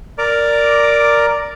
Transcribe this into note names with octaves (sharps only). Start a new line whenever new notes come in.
A#4 D5 A#5 D6